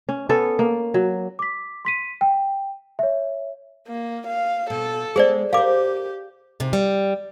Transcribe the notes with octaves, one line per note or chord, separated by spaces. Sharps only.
C#4
B3 C#4 A4
A#3
F#3
D6 B6
C6 B6 D#7
G5
C#5 E5
A#3
F5
B2 A4
G#3 B3 G#4 C5 D5
G4 A#4 C5 F5 D6
G#2 C3
G3